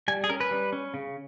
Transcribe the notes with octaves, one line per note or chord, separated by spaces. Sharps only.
G3 G#5
G#4
C#4 A#4
B4
G3
C#4
C#3